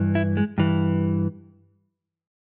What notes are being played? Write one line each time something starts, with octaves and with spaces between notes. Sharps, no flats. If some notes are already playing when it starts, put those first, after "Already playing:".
Already playing: G2 E3
E4
G#3
G2 E3